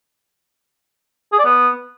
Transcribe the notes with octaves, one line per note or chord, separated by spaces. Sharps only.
G#4
D5
B3